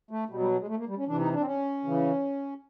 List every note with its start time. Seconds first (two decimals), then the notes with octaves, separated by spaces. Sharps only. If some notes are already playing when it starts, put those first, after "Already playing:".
0.11 A3
0.30 B2 F#3 G3
0.40 G3
0.60 G#3
0.69 A3
0.78 A#3
0.88 G3
0.98 C#4
1.08 C3 E3 D4
1.20 D#4
1.33 D4
1.40 C4
1.46 C#4
1.85 C#3 E3